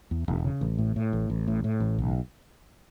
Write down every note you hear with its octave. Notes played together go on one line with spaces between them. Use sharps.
E2
E1
C#3
A1
A2
A2
A1
A1
A2
A2
A1
B1